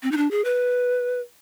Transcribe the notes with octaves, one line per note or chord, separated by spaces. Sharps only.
C4
D#4
D4
G#4
B4